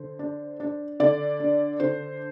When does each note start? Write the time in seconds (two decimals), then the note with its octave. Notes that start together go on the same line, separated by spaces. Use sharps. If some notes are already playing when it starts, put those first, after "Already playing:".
Already playing: D3 C5
0.19 D4
0.60 D4
1.00 D3 D5
1.40 D4
1.80 D3 C5